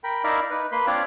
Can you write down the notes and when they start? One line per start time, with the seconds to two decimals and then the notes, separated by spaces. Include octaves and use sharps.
0.04 A#4 G5 B5
0.24 D#4 E4 A#4 D5 E5 F5
0.50 D#4 B4
0.72 A#3 B4 B5 C6
0.87 C4 D4 F4 C#5 D5 F5